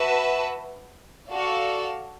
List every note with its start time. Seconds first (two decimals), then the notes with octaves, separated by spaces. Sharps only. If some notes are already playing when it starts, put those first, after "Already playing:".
Already playing: F#4 B4 E5 A5
1.32 F#4 A4 D5 F5 A5